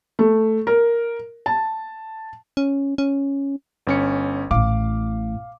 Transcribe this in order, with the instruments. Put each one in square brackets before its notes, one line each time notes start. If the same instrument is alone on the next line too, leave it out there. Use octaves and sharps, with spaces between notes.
[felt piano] A3
A#4
A5
[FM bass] C#4
C#4
[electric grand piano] G1 C#4 C#7
[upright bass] A1 A2 [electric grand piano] F5 D6